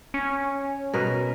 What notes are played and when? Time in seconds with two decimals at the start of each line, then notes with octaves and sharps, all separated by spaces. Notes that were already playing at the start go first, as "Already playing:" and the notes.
0.14 C#4
0.94 B2 A#4 B4